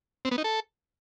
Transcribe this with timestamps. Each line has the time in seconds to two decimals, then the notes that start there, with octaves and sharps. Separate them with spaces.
0.25 C4
0.31 B3
0.38 D#4
0.44 A4